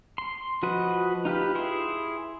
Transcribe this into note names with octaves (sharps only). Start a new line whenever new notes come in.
C6
F3 F#4 B4 D#5
D#4 F4 G4 B4
E4 G#4 C6